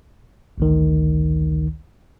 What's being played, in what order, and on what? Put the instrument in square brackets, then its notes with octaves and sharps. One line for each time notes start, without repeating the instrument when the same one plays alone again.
[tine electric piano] A1 D2 D#3